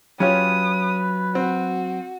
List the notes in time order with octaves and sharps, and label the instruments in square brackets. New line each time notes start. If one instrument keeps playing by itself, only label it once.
[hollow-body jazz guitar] F#3 G4 C#5 [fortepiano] C#4 F4 [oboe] B4 [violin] D#6
[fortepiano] C4 [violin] F#4